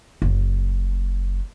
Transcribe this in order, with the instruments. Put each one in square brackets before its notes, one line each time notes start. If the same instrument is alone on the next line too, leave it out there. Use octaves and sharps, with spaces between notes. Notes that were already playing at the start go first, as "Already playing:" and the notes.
[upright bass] F#1